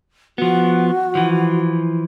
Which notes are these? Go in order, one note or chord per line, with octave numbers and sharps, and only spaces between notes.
F3 B3 F#4
E3 F3